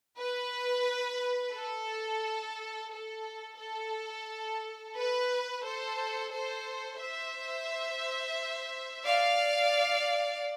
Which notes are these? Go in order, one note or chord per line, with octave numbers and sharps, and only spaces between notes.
B4
A4
A4
A4
B4
A4 C5
A4 C5
C5 E5
D5 F5